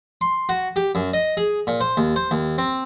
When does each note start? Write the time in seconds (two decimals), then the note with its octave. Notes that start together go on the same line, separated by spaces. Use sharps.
0.21 C6
0.49 F#4
0.76 G4
0.95 F#2
1.13 D#5
1.37 G#4
1.67 A#2
1.81 C5
1.97 D#2
2.16 C5
2.31 D#2
2.58 C4